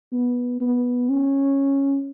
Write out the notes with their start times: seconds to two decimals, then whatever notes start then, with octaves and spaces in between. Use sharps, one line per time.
0.12 B3
0.60 B3
1.09 C#4